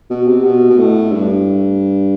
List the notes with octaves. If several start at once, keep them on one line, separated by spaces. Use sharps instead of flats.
B2
C3
B2
B2
A2
G2